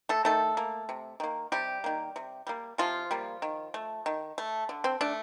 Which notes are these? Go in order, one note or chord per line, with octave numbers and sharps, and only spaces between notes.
A3 A4
D#3 A3 A4
A#3
C3
D#3 A#3
C3 G3 G4
D#3 A#3
C3
G3 A#3
C3 F3 F4
G3 A#3
D#3
A3
D#3
A3
D3
C4
A3 D4